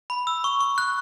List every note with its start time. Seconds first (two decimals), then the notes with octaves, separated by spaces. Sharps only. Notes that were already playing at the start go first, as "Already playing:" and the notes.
0.10 B5
0.27 E6
0.44 C#6
0.61 C#6
0.78 F#6